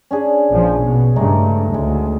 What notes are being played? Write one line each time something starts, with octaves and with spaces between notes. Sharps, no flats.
C#4 D4 G#4
A#1 F3
B2
G2 C#3 G#3 A3 D#4
D2 G#3